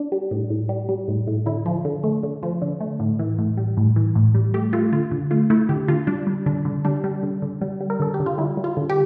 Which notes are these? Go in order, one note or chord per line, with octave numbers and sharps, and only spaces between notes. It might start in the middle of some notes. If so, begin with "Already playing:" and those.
Already playing: D4
G3
A2
A2
G3
G3
A2
A2
D3 E4
F3
D3
A3
D3
F3
D3
A3
A2
E3
A2
G3
A2
E3
A2
G3
A3 G4
A3 F4
D3 F4
D3
A3 F4
A3 E4
D3 G4
D3 F4
G3 D4
G3
D3 D4
D3
G3 D4
G3
D3
D3
G3
G3
A#4
D3 A4
G4
D3
F4
G3 E4
G3
F4
D3
G4